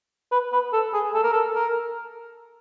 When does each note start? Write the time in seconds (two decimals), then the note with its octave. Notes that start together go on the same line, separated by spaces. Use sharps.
0.32 B4
0.52 B4
0.73 A4
0.94 G#4
1.14 A4
1.23 A#4
1.33 A4
1.55 A#4